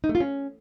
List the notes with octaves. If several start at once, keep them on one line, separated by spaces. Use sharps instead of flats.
D#4
A3
F4
C#4